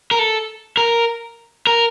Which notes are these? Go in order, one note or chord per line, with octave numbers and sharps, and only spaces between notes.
A#4
A4
A#4
A#4